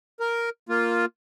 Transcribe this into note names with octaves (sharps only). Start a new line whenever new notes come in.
A#4
A#3 F4